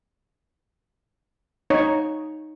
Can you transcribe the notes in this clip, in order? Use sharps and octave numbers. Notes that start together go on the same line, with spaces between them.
D#4 C#5